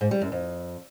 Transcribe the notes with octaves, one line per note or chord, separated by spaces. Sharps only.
G#2
G3
F#2
F2